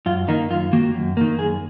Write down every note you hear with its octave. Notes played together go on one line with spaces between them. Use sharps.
F#2 F4
D#3 A#3 D#4
F#2 F4
D#3 A#3 F#4
F#2
D#3 A#3
F#2 G#4